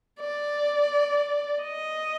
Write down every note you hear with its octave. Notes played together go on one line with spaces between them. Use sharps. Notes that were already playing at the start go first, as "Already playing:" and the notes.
D5
D#5